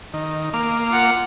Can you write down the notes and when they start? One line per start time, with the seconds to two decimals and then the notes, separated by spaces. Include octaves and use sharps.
0.14 D#3
0.54 A#3 F5 D6
0.90 F4 F#5